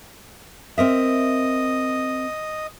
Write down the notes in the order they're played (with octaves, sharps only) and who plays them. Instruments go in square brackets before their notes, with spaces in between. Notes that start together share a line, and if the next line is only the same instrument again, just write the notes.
[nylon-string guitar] C4 A#4 E5 [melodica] D#5